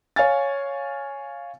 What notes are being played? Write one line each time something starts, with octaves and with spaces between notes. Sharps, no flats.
C#5 F5 G#5 A6